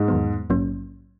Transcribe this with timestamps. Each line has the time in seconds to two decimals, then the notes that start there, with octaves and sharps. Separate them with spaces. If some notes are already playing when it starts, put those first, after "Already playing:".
Already playing: G#2 G#3
0.08 E2 D#3 F#3 B3
0.50 A#1 G#2 F#3 A#3 C#4